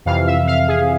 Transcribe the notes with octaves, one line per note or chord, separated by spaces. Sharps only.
F2 C3 E3 F5
E5
F5
G#4